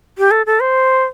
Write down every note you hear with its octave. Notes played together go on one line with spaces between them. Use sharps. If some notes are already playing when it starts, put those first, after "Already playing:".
G4
A4
A4
C5